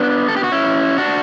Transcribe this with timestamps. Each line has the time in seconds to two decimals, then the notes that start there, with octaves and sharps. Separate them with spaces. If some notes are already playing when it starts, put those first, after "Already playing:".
Already playing: B3 D4
0.28 A4
0.37 G4
0.44 F#4
0.52 C#4 E4
0.98 D4 F#4